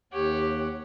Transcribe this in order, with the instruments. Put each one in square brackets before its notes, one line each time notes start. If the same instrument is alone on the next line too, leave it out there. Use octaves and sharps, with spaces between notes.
[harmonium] D#2 C#5 F#5 [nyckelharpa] G4